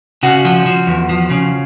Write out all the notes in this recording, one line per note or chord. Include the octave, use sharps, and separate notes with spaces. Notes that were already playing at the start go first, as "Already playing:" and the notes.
C#3 F#4
F3
F3
E2
F3
C#3